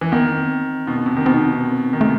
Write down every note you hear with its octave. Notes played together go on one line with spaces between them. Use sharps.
E3
D#3 B3
C4
B2
B2
C3
D#3
B2 C4
D#4
C4
D#3
C3 A3